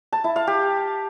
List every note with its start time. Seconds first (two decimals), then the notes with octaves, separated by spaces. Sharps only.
0.12 A5
0.24 E4
0.36 F5
0.47 G4